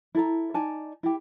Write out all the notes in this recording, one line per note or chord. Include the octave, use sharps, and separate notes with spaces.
E4 A4 A#5
D#4 D5 G#5 A5
E4 G4